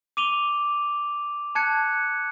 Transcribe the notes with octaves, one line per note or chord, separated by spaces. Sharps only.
D6 D#7 F7 G7
A5 F#6 G#6 C#7